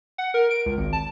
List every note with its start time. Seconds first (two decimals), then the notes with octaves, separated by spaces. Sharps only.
0.18 F#5
0.34 A#4
0.51 D7
0.66 C#2
0.78 G#1
0.93 A5